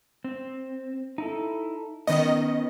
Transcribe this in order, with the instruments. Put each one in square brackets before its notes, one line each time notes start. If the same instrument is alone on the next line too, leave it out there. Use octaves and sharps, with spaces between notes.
[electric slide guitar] C4
D#4 E4 A4
[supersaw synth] D#3 D#5 [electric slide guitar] B3 C#4